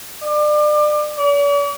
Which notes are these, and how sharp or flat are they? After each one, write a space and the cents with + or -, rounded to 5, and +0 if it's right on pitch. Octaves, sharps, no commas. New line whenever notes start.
D5 +30
D5 -45